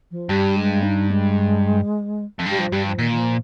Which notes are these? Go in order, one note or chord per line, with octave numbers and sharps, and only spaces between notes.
F3
G2 G3
G#3
D#4
G#3
F2
G2 G3
F3
G2 G3
F3
A#2 D#3
D#3
F3